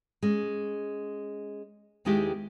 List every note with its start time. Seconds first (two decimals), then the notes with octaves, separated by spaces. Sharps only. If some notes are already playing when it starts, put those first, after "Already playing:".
0.23 G#3 C#4
2.05 D#2 D#3 G#3 B3 E4 G4